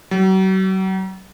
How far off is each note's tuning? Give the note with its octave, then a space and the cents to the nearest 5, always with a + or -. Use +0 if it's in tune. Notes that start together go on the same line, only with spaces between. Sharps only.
F#3 +40